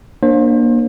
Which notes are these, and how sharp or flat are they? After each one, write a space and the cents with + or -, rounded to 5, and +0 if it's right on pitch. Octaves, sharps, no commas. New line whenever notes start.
A#3 +25 D4 +15 C5 +35